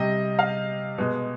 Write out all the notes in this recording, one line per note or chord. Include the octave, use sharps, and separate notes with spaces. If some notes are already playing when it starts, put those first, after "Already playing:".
Already playing: C3 G3 D#5
F5
B2 G#3